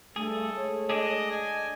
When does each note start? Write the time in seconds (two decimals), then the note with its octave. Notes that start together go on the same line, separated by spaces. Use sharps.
0.16 G2 A3 G#4 A4
0.56 G#3 A3 C#5
0.90 D4 G#4 D#5
1.31 D#5 G#5